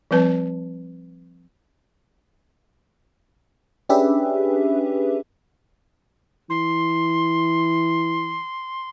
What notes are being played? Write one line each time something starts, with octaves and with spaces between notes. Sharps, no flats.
F3 G3 C4 B4 A5
C#4 D4 G4 G#4 B4 E5
E3 C6